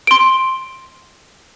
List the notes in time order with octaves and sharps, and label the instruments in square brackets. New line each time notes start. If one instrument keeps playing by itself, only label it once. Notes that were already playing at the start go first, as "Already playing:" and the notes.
[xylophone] C6 D7